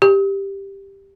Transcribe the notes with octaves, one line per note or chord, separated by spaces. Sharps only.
G4